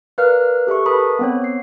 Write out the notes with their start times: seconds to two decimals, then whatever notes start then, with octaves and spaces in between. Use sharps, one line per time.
0.18 A#4 B4 D5 F5 F6 F#6
0.67 G4 A4 E5 C#6
0.86 A#4 B4 A5 B5 D#6
1.19 B3 C4 C#5
1.44 C7